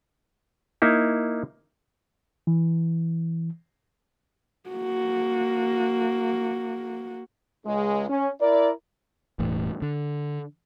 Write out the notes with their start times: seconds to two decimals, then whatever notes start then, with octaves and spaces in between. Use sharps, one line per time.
0.82 A#3 D#4 E4
2.47 E3
4.69 A#3 F#4
7.66 C#2 G#3
8.09 C#4
8.41 E4 A#4 D5
9.39 E1 E2 A2
9.82 D3